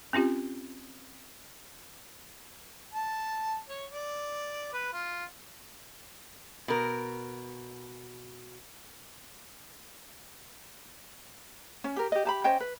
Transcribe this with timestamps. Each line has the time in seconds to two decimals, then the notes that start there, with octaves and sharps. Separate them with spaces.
0.13 C4 C#4 F4 G4
2.94 A5
3.69 C#5
3.91 D5
4.73 B4
4.93 F4
6.68 B2 A#4
11.84 C#4
11.96 G4 A#4
12.12 G4 D#5
12.25 G4 A5 B5
12.44 C#4 C5 D#5 G5
12.60 B4